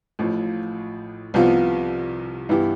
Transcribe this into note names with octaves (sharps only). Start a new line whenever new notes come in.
A1 A2 F3
C2 C3 F3 B3 F4
G2 E3 B3 E4 G4